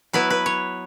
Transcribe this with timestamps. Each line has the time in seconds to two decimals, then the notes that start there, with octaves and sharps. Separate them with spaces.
0.13 F#3 B3 E4 B4
0.30 B4
0.46 C#5